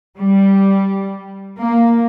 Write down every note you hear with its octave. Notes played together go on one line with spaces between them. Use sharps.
G3
A#3